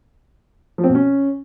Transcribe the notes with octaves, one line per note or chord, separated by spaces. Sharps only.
F3
C4
B2
C#4